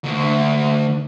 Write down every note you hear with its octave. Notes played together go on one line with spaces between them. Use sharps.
D2